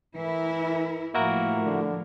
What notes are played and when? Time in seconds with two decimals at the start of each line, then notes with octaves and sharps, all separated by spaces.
0.16 E3 E4 A#4
1.14 A2 F3 A#3 E4 F#4 A#4
1.65 D3